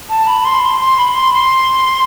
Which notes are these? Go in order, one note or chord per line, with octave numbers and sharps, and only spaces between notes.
A5
B5
C6
C6
C6
B5
C6
C6